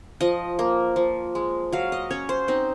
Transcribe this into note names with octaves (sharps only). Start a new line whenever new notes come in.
F3 D#5
A#3
F3
G#3
F#3 F5
D#5
C#4 C#5
C5
C4 D#4